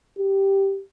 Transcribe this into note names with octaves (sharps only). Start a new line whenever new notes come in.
G4